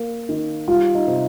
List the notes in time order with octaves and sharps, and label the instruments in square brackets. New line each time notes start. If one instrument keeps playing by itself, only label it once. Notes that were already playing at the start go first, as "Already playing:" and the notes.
Already playing: [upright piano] A#3
D#3
[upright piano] G3 [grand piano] F4
[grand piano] D#4
[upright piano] C3